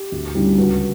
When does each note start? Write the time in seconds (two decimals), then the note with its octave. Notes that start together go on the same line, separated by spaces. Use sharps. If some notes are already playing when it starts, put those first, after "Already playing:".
Already playing: G4
0.12 D2
0.35 D3 G3 C#4 E4
0.58 C#2 F#4